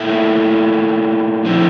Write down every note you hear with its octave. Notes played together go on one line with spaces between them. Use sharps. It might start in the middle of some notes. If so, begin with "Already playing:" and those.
Already playing: A#2 A3 E4
D3 F3 C4 E4